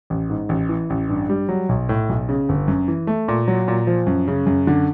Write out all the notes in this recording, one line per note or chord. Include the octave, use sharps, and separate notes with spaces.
A1
G#2
A1
E3
A1
G2
G3
F#3
B1
A2
B1
C#3
G1
F#2
E3
A3
A#2
F#3
A#2
F3
F#2
C#3
F#2
D3